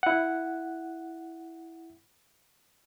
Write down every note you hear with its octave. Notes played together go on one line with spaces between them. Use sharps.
E4 F#5